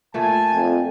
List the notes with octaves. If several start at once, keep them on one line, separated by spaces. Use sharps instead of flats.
A#2 A3 G#5 A5
F2